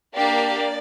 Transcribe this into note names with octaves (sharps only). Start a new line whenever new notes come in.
A#3 D4 G4 D5